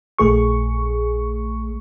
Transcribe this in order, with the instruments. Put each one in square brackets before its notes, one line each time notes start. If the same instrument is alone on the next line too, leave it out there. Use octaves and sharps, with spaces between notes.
[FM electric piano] A#1 A3 G#4 C#6